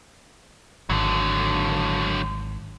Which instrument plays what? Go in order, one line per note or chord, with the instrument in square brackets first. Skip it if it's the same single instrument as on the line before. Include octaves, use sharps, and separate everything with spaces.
[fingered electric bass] G#1 [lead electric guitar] D3 F#3